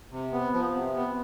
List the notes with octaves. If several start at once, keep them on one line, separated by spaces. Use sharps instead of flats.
C3
B3
F3
C3
B3